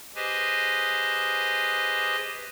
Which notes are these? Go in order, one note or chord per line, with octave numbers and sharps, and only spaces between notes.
G4 G#4 B4 C5 D#5 G#5